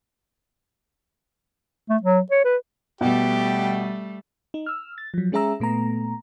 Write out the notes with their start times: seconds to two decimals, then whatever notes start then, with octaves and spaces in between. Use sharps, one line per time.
1.89 A3
2.02 F#3
2.31 C#5
2.44 B4
3.01 B2 G3 A3 G4
4.54 D#4
4.66 E6 F6
4.98 A6
5.14 F3 F#3
5.32 G#3 C#4 G#4 E5 A#5 E6
5.60 A#2 A3 B3 A#5